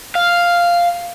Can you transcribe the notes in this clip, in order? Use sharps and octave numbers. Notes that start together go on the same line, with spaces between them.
F5